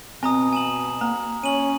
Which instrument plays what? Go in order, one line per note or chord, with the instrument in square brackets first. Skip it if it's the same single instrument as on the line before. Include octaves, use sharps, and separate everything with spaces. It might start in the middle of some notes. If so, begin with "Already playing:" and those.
[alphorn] B2 [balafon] C4 [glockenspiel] G#5 A#5 D#6
[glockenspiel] G#5 E7 F#7
[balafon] A#3 [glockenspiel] A#5
[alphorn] C#4 [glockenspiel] D#7 F#7